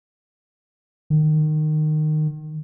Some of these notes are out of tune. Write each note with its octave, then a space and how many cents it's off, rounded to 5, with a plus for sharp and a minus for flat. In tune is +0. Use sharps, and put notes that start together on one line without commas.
D#3 -20